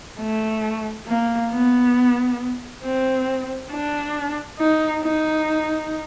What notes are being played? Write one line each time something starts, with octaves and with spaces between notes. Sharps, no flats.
A3
A#3
B3
C4
D4
D#4
D#4